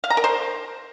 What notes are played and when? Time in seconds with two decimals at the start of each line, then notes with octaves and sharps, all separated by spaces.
0.04 F5
0.10 A#5
0.17 A#4
0.24 C5